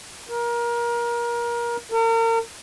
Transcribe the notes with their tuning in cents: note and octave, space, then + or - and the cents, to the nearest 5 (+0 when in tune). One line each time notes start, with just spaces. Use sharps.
A#4 +25
A#4 -35